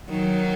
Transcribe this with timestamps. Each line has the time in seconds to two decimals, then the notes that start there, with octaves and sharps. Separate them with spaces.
0.10 D#3 F#3